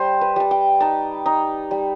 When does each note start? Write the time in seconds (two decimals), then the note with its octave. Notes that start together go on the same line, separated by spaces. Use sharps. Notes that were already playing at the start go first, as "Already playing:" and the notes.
Already playing: G3 C5
0.21 B4
0.36 G3 A5
0.51 G5
0.80 D#4 A5
1.26 D#4
1.71 G3